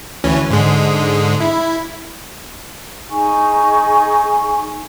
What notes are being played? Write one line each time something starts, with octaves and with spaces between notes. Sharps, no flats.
D2 E3 C#4
G#2 D3 G#3
E4
D#4 G#4 G#5 C#6